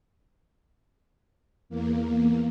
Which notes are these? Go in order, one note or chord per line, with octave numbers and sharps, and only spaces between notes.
E2 A#3